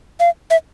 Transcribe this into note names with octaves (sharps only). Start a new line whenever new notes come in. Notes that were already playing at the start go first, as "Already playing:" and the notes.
F5
E5